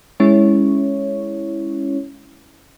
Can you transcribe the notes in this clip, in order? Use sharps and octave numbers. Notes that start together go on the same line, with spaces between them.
G#3 C#4 E4 C#5